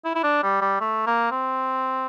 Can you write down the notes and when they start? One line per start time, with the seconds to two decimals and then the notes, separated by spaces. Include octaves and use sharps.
0.05 E4
0.15 E4
0.24 D4
0.43 G3
0.61 G3
0.81 A3
1.07 A#3
1.31 C4